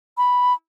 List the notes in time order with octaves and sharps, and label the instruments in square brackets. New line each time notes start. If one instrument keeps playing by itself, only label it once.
[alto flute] B5